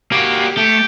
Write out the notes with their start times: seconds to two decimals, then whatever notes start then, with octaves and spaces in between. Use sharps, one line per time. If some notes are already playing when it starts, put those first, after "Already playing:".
0.12 A#3 F#4 G4
0.57 A3 G4